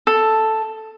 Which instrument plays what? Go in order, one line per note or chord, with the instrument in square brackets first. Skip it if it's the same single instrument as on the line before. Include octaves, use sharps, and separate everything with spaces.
[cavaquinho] A4